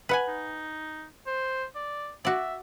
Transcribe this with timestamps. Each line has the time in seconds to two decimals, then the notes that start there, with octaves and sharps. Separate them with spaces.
0.09 B4 F#5 G#5
0.28 D#4
1.27 C5
1.75 D5
2.25 F#4 D5 E5